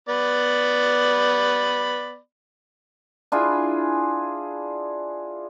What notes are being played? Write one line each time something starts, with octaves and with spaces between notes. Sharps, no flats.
B3 D5 B5
D4 E4 F4 G#4